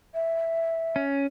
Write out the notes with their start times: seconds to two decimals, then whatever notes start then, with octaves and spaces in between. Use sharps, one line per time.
0.14 E5
0.96 C#4